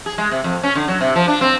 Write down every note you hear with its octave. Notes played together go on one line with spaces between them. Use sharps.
G#4
G#3
C3
F2
C#4
D3
F#3
C3
F3
D4
C4